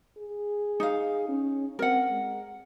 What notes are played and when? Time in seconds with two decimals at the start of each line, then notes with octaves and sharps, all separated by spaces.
0.17 G#4
0.80 D#4 F5
1.28 C#4
1.79 C4 A#4 F#5
2.10 G#3